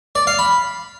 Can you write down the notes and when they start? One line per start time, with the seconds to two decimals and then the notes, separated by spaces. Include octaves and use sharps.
0.15 D5
0.27 F5
0.39 B5